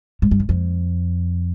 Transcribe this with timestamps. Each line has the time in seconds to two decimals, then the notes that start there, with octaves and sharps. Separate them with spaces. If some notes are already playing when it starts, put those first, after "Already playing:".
0.22 G#2
0.31 G2
0.40 F#2
0.49 F2